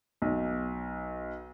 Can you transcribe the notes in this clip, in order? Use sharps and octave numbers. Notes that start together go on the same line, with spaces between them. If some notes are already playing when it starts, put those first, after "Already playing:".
B1